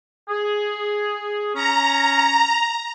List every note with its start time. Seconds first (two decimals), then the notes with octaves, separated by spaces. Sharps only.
0.28 G#4
1.54 C#4 A#5